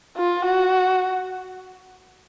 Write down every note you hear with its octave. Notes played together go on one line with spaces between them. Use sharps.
F4
F#4